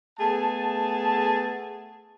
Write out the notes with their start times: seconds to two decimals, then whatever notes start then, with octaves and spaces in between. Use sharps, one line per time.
0.19 A3 B3 G#4 A5